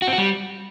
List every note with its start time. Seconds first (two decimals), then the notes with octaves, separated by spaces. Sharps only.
0.02 F#4
0.07 C4
0.13 F#4
0.18 G3